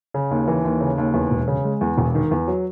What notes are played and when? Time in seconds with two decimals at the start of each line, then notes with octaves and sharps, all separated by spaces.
0.14 C#3
0.31 D#2
0.48 E3
0.65 D#2
0.81 C#3
0.98 D#2
1.14 E2
1.31 E1
1.48 C#3
1.65 G#3
1.81 E2
1.98 E1
2.15 D#3
2.31 E2
2.48 F#3